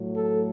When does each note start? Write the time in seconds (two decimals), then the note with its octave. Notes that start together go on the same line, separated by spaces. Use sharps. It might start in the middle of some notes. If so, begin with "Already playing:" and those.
Already playing: A2 F#3 A3
0.16 A4